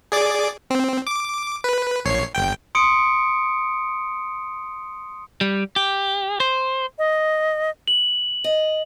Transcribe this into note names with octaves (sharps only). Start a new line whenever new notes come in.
G#4 D5 D6
C4
D6
B4
A#1 C#5 C7
G1 G5
C6 D#6 C#7 D7
G3
G4
C5
D#5
F#7
D#5